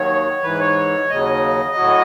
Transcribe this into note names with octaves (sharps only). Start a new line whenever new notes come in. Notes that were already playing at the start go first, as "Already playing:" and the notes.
Already playing: D#2 D#3 F#3 C#5
G#2 E3 B4
C#5
D#2 C#3 F#3 D#5
A2 F#3